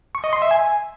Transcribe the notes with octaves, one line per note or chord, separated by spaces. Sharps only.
C#6
D#5
C6
E5
G#5